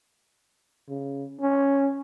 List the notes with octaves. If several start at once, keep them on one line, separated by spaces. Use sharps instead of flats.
C#3
C#4